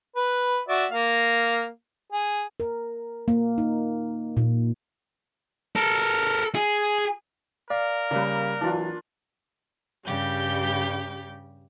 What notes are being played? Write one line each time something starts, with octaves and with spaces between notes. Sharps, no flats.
B4
F#4 D5 E5
A#3 F5
G#4
A#4
A#3
D#4
A#2
A4 A#4
G#4
A#4 D5 F5
C#3 G3 A#3 B4
E3 F#3 D4 F4
G2 C#3 G3 G4 G6